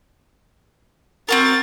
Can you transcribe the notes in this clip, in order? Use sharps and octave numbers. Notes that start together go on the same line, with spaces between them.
C4 F#4 A#4 A6